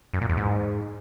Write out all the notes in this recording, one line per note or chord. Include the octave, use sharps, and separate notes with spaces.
F#2
A#2
E2
G#2